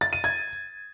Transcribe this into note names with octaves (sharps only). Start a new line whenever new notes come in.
A6
D#7
G#6